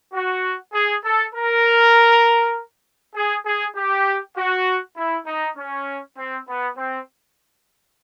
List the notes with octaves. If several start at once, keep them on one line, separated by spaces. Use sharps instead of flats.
F#4
G#4
A4
A#4
G#4
G#4
G4
F#4
E4
D#4
C#4
C4
B3
C4